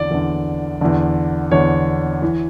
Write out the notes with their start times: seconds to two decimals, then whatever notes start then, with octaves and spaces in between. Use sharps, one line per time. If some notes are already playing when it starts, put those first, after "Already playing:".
Already playing: E2 D3 D5
0.11 E2 D3
0.81 E2 D3
1.51 E2 D3 C#5
2.22 E3